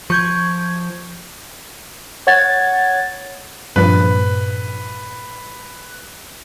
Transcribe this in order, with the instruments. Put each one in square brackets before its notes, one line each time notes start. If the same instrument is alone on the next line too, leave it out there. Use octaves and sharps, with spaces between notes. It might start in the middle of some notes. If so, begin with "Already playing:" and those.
[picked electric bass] F3 [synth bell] C#6 G6 G#6
[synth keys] C#5 F#5 G#6 A6
[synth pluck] G2 A#2 F3 [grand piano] B4